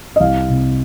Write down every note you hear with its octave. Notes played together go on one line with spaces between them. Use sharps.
D#5
C2 F5
C3